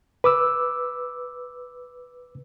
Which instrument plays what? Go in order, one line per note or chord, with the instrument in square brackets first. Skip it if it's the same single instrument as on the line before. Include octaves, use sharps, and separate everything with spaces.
[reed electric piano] B4 D6 E6